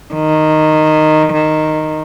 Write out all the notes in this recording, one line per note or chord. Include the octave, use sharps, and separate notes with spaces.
D#3
D#3